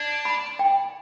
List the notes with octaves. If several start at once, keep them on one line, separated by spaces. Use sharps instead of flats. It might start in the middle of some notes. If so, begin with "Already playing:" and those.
Already playing: D4 D5
B5
G5